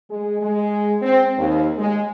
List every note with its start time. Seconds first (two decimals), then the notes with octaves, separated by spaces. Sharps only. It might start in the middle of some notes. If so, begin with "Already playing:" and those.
0.10 G#3
0.41 G#3
1.02 C4
1.36 D#2
1.77 G#3